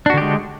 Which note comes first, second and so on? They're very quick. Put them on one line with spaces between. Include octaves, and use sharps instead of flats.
D4 F#4 D3 G4 G#3